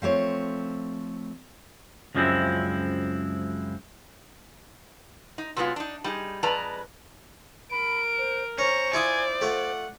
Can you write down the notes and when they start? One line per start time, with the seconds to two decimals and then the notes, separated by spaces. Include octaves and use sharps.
0.02 F3 A3 C4 C#5
2.15 C#2 F#2 F3 G#3 C4 E4
5.38 D#4
5.56 C3 F#3 G#3 B3 F4
5.76 D4 D#4
6.04 G3 D#4 G#4
6.43 F2 G#3 B4 D5 A5 A#5
7.71 A#4 B5 D7
8.18 C5
8.58 C#4 C5 A#5 C#6
8.93 E4 F4 D5 G#5 D#6
9.41 A3 F4 F#5